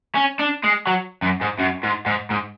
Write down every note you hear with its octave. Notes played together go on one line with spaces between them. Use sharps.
C#4
D4
G#3
F#3
F#2
G#2
F#2
G#2
G#2
G#2